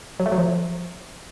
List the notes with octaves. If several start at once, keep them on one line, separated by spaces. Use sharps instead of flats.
F#3
A3
F#3
F3